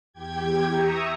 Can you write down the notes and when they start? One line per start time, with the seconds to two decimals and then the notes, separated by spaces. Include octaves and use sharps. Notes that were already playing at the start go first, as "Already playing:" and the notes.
0.13 E2 G4 G5 G#6
0.70 E5 A#5 C#6 D#6